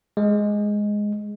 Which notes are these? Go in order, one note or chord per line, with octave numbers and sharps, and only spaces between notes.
G#3